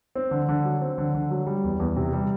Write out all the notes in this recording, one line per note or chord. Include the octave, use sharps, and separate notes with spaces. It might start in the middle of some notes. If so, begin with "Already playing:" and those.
C4
D3
D3
F#3
C4
D3
D3
F#3
G3
E2
E2
C3
G3